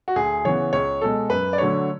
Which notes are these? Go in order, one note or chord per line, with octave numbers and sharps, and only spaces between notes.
F#4
D2 G#4
C#3 E3 B3 C#5
C#2 C#5
B2 G#3 A4
F#2 B4
D5
D3 F#3 A3 D4 C#5